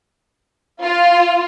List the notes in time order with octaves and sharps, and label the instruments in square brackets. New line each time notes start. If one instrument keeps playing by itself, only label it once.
[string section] F4